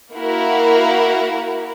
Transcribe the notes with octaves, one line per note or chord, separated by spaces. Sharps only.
A#3 E4 F#4 A#4